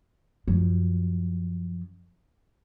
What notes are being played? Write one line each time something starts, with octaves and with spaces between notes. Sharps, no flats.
F#2 F3